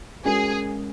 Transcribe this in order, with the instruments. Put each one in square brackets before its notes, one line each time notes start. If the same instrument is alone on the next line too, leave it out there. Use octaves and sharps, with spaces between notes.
[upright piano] G#3 C#4 F#4 A#4 [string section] G#4